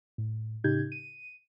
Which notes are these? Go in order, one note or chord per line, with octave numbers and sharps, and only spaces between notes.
A2
A2 C#3 D#4 G4 G6 G#6
D#7